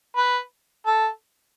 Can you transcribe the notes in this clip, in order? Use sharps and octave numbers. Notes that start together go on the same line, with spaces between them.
B4
A4